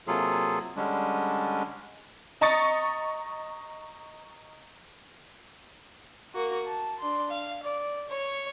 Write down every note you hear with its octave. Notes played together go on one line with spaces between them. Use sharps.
C3 F#3 A#3 F4 G#4 A4
D3 G3 G#3 C#4 D4
D#5 A#5 C#6 D#6 A6 C#7
A#3 F#4
A5
D4 C6
F5
D5
C#5